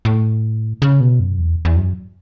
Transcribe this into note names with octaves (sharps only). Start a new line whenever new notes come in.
A2
C#3
B2
F#2
E2
E2
F#2